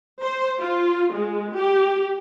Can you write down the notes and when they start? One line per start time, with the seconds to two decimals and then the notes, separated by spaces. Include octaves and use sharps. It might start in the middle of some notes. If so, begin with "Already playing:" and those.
0.23 C5
0.61 F4
1.13 G#3
1.56 G4